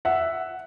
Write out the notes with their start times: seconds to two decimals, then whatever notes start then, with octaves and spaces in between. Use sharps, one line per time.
0.05 E5 F#5